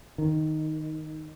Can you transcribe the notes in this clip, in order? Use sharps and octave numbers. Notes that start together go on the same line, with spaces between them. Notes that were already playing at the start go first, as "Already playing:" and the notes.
D#3